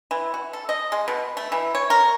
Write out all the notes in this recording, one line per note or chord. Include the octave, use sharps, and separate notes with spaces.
E3
F#4
A4
D#5
G#3
B2
A3
E3
C#5
A#4